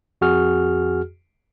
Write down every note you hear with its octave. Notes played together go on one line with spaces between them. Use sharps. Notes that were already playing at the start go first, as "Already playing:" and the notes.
F2 F#4 G#4 F6